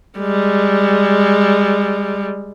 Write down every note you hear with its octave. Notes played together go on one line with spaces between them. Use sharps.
G3 G#3